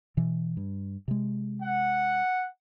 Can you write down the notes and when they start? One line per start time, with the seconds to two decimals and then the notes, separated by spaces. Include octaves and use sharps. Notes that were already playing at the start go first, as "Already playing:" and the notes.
0.17 B2 E3
0.57 G2
1.08 C3 G#3
1.62 F#5